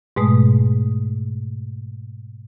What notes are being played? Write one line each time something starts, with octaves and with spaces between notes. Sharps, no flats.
G#2 B2 G#3 A3 D#6